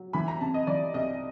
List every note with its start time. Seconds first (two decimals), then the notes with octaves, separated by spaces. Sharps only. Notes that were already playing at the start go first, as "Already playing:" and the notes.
Already playing: F#3
0.13 E3 B5
0.28 A#5
0.41 C3 A5
0.54 D#5
0.67 E3 D5
0.94 C2 D#5